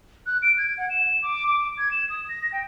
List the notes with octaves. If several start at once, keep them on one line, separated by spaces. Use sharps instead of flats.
F#6
D7
G#6
F#5
E7
D6
D6
G#6
E7
D#6
A#6
G5